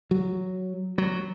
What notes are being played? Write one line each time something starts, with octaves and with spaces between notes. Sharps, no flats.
F#3
F#3